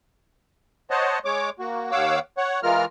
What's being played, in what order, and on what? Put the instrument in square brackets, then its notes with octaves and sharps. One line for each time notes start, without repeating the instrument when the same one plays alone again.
[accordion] C5 C#5 D#5 F#5 A5
G#3 C#5 D6
A#3 F#4
D#2 C#5 F5 F#5 D6 E6
C#5 F#5
E3 G#3 F4 A#4 F6